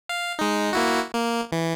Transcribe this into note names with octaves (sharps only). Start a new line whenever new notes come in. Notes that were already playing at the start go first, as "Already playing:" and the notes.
F5
G#3 D#4
A#3 E4 F#4
A#3
E3